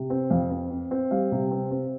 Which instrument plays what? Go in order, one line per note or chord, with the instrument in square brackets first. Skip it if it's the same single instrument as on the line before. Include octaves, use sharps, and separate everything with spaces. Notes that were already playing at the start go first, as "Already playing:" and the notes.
Already playing: [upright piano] C3
C4
F2 F5
C4
C4
C4
G3 F5
C3
C4
C4